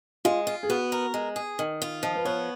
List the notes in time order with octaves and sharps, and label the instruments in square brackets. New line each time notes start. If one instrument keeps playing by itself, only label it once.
[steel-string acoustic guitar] G#3 [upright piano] F4
[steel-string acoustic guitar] F4
[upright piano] G#4
[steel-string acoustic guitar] B3 [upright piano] F#4
[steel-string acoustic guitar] A#4
G#3
G#4
D#3
F4
[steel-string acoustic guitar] F3 [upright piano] D#5
[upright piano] B4
[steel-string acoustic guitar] B3 [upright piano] C#5